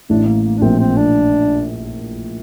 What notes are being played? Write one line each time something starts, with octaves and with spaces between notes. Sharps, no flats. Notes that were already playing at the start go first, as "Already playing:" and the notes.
A1 A2 D4
A#3
A#3
D4
A#1 A#2 C4
C4
D4